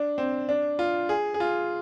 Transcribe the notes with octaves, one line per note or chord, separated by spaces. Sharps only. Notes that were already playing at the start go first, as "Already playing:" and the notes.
Already playing: D4
C4
D4
F4
G#4
G#4
F4